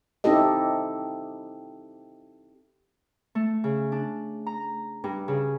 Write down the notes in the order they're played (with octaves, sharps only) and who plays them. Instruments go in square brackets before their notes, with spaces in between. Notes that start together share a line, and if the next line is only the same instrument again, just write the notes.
[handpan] C4 D#4 E4 G4 A4 D#5
[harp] A3
C#3
D4
A#5
G2
C#3